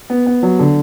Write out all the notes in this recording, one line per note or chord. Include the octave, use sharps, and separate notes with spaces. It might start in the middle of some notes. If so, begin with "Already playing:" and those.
B3
B3
F#3
D3